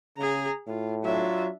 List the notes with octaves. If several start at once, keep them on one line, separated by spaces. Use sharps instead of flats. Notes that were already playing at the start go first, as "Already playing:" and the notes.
C#3 G#4 A#5
A2 F4
F#3 D4 F4 E5